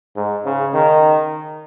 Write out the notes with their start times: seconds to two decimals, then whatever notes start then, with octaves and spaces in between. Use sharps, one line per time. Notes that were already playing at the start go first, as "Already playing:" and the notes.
0.16 G#2
0.45 C#3
0.74 D#3